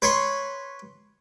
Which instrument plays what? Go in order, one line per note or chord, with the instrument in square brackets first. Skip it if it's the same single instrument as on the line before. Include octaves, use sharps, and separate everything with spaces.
[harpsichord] B4 C#5 C6